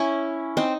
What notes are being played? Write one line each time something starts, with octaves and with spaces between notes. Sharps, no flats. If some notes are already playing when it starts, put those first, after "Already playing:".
Already playing: C#4 E4
C4 D#4